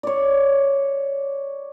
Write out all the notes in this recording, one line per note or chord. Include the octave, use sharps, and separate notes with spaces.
C#5 D5